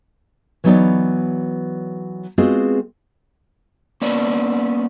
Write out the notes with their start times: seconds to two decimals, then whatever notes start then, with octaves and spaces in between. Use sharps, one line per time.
0.64 E3 F#3 B3 D#4 C#5 D5
2.38 G#3 B3 C4 F4 F#4 G#4
4.02 A#3 B3 C#4 D5